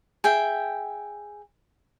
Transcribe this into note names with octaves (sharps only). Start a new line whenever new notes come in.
G#4 E5 G5